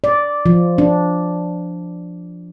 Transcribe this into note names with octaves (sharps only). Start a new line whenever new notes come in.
D5
F3
D4